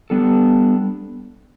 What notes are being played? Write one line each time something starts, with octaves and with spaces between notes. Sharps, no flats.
G3 B3 D4 A4